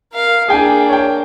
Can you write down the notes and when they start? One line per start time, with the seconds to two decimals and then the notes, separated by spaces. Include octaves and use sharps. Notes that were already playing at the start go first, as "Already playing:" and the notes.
0.13 A#4 F5
0.48 A#3 D4 G#4 G5 G#5
0.89 C#5 G5